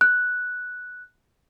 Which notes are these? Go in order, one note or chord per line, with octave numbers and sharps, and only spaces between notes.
F#6